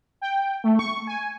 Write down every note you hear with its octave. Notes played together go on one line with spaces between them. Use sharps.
G5
A3
C#6
G#5